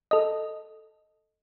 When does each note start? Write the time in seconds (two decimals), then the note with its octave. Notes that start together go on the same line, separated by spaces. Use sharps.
0.11 A4 D#5